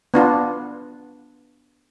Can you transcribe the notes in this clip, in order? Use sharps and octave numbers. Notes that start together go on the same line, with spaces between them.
B3 D4 F4